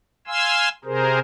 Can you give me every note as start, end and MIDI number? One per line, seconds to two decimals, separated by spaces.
0.27 0.69 77
0.27 0.69 80
0.27 0.69 84
0.27 0.69 88
0.85 1.19 48
0.85 1.19 68
0.85 1.19 70
0.85 1.19 72